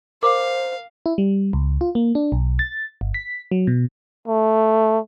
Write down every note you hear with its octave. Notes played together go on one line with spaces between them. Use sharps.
A#4 C5 F5 D6
E4
G3
C#2
F4
A#3
D4
B1
A6
G1
B6
F#3
B2
A3